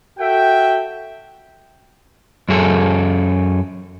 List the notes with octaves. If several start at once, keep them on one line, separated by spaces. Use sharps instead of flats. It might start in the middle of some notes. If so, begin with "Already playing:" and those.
F#4 A4 E5 G5
F#2 F#3 G#4 A4